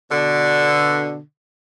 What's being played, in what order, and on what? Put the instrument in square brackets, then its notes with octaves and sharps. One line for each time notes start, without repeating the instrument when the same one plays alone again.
[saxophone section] B2 D3